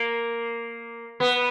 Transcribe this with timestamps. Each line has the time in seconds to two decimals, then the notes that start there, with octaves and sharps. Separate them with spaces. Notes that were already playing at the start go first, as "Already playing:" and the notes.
Already playing: A#3
1.20 B3